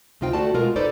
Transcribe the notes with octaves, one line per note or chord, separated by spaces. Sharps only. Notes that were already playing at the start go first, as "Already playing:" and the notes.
D2 C3 D#4 F4 C5 G5
A3 F#4 A4 D5 A5
B2 G#3 F4 A#4
D#4 A4 B4 C5 D5